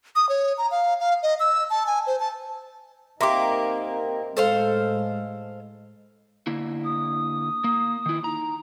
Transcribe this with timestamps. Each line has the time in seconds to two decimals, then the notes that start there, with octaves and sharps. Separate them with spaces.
0.16 D#6
0.29 C#5
0.58 A#5
0.71 F5
1.00 F5
1.23 D#5
1.40 E6
1.70 A5
1.87 G#5
2.07 C5
2.20 A5
3.21 A#3 C4 D#4 G4 E5 C6 D6
4.37 A2 G#3 A4 C5 F5
6.47 D3 A#3 E4
6.84 D#6
7.64 A#3
8.06 D#3 E4
8.24 D#4 A#5